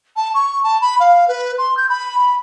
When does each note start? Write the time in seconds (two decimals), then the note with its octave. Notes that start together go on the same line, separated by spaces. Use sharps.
0.16 A5
0.34 C#6
0.63 A5
0.81 B5
0.99 F5
1.28 B4
1.58 C6
1.77 G6
1.89 B5
2.18 B5